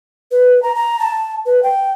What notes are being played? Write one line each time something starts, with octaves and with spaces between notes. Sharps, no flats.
B4
A#5
A#5
A5
B4
G5